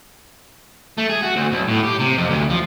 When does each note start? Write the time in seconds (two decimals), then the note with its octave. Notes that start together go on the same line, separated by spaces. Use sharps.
0.98 A3
1.09 G#4
1.22 F#4
1.36 D2
1.52 B1
1.68 A2
1.84 G4
2.00 C3
2.18 F2
2.30 D2
2.50 F3